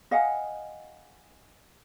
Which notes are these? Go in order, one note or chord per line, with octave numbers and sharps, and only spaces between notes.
D#5 F5 F#5 G#5